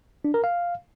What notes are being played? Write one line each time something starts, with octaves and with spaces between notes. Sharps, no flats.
D4
A#4
F5